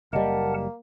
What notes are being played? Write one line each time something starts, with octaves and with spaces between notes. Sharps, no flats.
F#1 G3 A#3 A#4 D5 D#5 F#5 A5